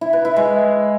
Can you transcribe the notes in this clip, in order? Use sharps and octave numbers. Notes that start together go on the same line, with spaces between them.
E4
B4
E4
G#3